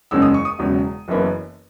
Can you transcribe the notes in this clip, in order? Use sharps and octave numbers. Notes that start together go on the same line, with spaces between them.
F#1 E2 C#3 G#3 C#4 E6
D#6
C#6
D#6
E1 E2 C#3 F#3
F#1 F#2 E3 B3